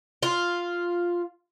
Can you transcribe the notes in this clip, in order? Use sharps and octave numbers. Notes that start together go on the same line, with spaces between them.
F4